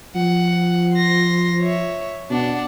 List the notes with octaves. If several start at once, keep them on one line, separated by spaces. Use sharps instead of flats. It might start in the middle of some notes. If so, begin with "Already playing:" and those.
F3 F#5
C6 A#6
C#5 E5
B2 D4 F#5